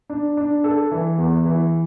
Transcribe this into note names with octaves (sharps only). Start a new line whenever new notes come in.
D4
D4
A4
E3
E2
E3